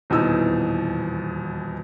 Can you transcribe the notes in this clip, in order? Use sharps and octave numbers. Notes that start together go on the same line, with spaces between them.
D#1 E2 B2 E3 D#4 E6